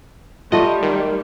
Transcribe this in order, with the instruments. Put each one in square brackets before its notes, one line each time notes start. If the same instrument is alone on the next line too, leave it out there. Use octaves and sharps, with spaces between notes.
[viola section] G3 [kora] A3 F#5 [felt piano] F4 [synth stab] D#5
[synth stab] D#3